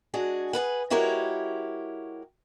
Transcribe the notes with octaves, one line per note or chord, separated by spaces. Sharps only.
G#3 D4 F#4 G#4
G#4 A4 B4 F#5
G#3 E4 F#4 G4 A#4 C#5